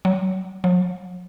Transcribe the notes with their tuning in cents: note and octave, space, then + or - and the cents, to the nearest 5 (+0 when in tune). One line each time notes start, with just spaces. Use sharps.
F#3 +20
F#3 -45